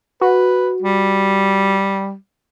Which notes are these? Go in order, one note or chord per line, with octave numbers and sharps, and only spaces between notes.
F#4 B4
G3